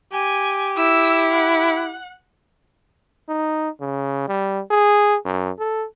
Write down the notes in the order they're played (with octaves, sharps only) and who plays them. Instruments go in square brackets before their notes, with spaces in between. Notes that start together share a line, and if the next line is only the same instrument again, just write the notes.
[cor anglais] G4 [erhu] G#5
[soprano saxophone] E4 [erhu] E6
[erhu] F#5
[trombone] D#4
C#3
G3
G#4
F#2
A4